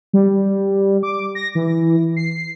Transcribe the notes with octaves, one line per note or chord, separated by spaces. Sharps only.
G3
D6
A#6
E3
C7